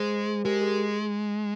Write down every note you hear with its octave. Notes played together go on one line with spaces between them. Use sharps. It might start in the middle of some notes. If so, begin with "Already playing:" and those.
Already playing: G#3 G#4 C5
G#3 G4 A#4
G#4